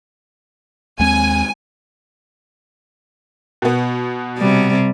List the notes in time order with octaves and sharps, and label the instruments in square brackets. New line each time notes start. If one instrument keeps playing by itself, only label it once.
[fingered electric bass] D#2 G#3 C4 [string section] G#5
[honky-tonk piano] B2 B3
[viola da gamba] C3 G3